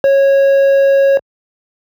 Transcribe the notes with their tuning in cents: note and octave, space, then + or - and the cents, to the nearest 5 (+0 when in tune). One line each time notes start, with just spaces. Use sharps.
C#5 -15